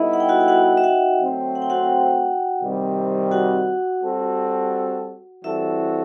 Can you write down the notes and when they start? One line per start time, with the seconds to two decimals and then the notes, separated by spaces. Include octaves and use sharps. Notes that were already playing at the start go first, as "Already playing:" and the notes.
Already playing: G3 B3 D#4 E4 A4 D#5
0.13 F#5
0.20 G5
0.29 F#4 F#5
0.40 G5
0.48 F#4 F#5
0.77 E5
0.84 F#4 F#5
1.20 F#3 A3 C4
1.55 F#5
1.62 G5
1.70 F#4 F#5
2.61 C3 D#3 G3 C4
3.31 F#4 F#5
4.03 G3 C4 F#4 A4
5.44 E3 G3 C4 E4 F#4 A4 E5